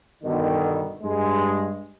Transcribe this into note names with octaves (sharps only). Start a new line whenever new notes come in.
G2 B2 D3 D#3
G2 G#3